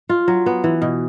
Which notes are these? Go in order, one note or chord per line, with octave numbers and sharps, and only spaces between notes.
F4
F#3
B3
E3
B2